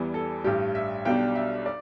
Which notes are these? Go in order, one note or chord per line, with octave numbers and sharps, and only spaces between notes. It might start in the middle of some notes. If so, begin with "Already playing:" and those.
Already playing: E2 E3 G3
A4
A1 G2 G3 G4
E5
B1 B2 G3 D4 G5
E5
D5